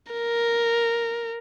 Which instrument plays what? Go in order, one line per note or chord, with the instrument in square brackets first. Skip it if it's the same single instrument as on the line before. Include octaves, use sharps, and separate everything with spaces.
[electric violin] A#4